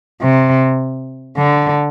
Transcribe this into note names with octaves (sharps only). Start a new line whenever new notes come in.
C3
D3